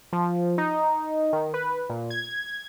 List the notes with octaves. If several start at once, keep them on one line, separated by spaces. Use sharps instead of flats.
F3
D#4
D#3
B4
A#2
G#6